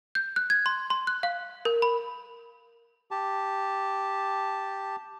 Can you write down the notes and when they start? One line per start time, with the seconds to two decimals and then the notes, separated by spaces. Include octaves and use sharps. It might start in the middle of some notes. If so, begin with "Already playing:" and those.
0.15 G6
0.36 F#6
0.50 G#6
0.66 C6
0.90 C6
1.07 F#6
1.23 F5
1.65 A#4
1.82 B5
3.11 G4 A5